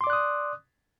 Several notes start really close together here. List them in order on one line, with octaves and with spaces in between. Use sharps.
C6 D6 D5 F#6 D#6